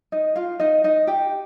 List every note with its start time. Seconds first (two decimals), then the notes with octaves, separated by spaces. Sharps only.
0.12 D#4 D#5
0.36 F4 F5
0.60 D#4 D#5
0.84 D#4 D#5
1.07 G4 G5